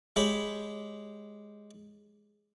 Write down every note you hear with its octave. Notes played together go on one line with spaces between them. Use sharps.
G#3 G4 C#5 B5